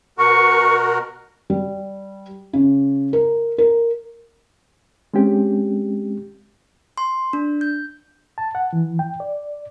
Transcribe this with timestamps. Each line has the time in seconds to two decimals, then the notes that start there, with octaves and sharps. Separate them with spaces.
0.18 B2 F#4 A#4 C#6
1.50 G3
2.53 C#3
3.13 A#4
3.58 A#4
5.14 G#3 C4 C#4 G4
6.98 C6
7.33 D4
7.61 G6
8.38 A5
8.55 F#5
8.73 E3
8.99 G5
9.20 D5